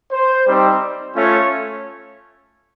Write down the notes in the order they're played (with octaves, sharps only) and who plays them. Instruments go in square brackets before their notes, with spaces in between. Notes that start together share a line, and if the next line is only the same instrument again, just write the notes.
[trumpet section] C5
G3 C4 D#4 C5
A3 C#4 F4 C#5